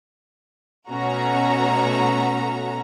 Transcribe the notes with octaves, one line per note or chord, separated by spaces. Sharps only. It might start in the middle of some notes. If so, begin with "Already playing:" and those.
B2 A3 C#4 F#4 A#5